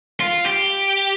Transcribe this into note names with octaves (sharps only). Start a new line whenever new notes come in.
F4
G4